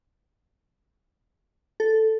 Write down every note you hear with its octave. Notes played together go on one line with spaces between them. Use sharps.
A4